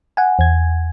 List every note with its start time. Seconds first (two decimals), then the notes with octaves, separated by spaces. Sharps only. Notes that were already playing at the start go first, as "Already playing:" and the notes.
0.17 F#5 G#5
0.39 E2 G#6